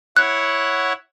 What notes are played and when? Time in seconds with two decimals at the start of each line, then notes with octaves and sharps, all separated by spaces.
0.17 E4 C#5 F#5 F#6